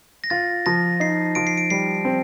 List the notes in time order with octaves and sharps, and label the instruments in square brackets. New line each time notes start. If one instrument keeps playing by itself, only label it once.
[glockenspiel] A#6
[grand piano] F4 [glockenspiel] A6
[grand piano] F3 [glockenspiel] A#6
[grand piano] D#4 [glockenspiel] C7
[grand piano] F3 [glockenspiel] D7
[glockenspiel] C7
D7
[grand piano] G3 [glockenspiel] C7
[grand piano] C4